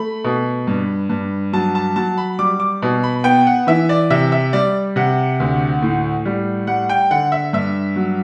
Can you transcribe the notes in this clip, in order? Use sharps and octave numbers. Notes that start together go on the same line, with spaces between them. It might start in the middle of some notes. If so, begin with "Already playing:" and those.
Already playing: A3 B5
B2
G2
G2
F#3 A5
A5
F#3 A5
B5
G3 D6
D6
B2
B5
B3 G5
F#5
E3 E5
D5
C3 E5
E5
G3 D5
C3 F#5
D2
A2
G3
G3 F#5
G5
D3 F#5
E5
G2 E5
F#3